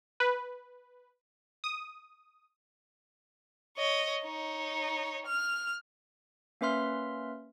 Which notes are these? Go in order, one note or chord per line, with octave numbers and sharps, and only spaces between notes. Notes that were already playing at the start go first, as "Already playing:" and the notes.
B4
D#6
C#5 D#5
D#4 C#5
F6
A#3 C#4 B4 E5 C6 F6